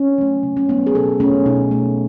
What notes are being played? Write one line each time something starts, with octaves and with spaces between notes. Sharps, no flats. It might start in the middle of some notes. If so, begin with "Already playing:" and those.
Already playing: C#4
F#3 A3
C#3
C#4
F#3 A3 B3
G#4
B2 A4
A3 C#4
B2 D#4
A3